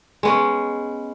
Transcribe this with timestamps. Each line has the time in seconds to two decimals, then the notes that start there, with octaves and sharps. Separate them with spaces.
0.23 G#3 B3 C#4